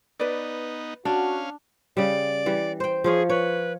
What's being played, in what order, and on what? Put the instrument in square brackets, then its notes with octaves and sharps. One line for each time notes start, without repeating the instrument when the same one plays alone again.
[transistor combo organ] B3 D#4 [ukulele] B4 D5
[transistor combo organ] C#4 F5 [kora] D4 [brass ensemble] F#4
[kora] C#3 G3 [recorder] D5
[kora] E3 G3
C5 G5
[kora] F3 F4 C#5 [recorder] G#4
[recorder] B4 [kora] C#5